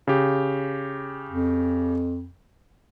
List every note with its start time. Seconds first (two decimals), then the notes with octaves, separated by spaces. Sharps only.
0.07 C#3 G4
1.29 F2